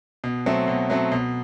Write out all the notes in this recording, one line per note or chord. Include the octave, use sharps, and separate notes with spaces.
B2
F#3 A3 C4
B2
F#3 A3 C4
B2